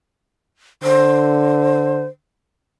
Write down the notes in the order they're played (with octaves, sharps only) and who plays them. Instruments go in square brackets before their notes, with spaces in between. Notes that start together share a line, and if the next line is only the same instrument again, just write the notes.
[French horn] D3 [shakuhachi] C5